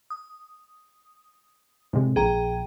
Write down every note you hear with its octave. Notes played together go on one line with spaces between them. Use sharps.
D#6
A2 C3 G#3
A#1 G#4 G5 A#5